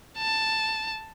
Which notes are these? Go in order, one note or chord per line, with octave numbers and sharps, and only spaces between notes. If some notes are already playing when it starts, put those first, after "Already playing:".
A5